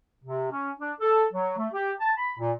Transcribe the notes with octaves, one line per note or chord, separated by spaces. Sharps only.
C3
C#4
D4
A4
F#3
A3
G4
A5
B5
A#2